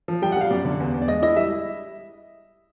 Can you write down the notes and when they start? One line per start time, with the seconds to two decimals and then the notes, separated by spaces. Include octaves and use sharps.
0.08 F3
0.22 G3 G5
0.32 F#5
0.37 G3 F5
0.51 F#2 D5
0.65 D3
0.80 E2
0.94 E2
1.02 D5
1.08 G#3 D#5
1.22 E4 D#5
1.36 G3 E5